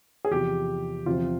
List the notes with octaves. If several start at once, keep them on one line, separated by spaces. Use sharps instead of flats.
G#4
E2 C3 F3 G4
E2 C3 F3 C4 F4